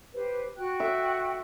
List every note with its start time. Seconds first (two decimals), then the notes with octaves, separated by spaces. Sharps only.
0.15 G4 B4 C5
0.57 F#4 G5 F#6
0.80 E5